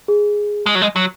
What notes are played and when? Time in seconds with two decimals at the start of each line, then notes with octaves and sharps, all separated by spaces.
0.08 G#4
0.66 G#3
0.75 F#3
0.82 G#3
0.96 F#3